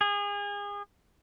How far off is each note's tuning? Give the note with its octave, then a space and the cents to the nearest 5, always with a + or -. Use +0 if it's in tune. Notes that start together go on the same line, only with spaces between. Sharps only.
G#4 -30